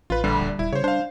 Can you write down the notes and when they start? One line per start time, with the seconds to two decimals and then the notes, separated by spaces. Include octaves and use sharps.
0.10 A1 F4 B4
0.24 A#1 D3 G3
0.40 D#1
0.59 D#1 E4
0.73 C#3 C5 C#5
0.84 D4 C5 F5